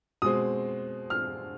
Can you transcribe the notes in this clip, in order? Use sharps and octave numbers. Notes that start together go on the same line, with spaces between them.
B2 G#3 C4 D#6
F6